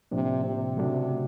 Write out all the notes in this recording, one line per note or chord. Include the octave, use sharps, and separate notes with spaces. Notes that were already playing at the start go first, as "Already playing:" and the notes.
A2 C3 F3 A#3 D4
C3
C#3 F#3 A3 D4 F#4